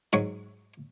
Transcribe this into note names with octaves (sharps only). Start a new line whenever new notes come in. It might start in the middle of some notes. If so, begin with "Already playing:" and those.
G#2 F#3 C#6